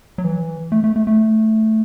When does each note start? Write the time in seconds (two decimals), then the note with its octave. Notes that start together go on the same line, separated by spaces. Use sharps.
0.18 F#3
0.24 E3
0.72 A3
0.84 A3
0.96 A3
1.07 A3